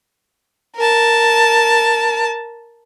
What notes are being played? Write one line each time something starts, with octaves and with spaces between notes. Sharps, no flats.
A#4 A5